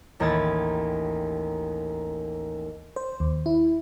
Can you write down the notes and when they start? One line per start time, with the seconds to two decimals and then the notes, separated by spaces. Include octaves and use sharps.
0.20 A1 D#2 B5 D#6 G#6 A6
2.96 C5
3.20 D#2
3.46 E4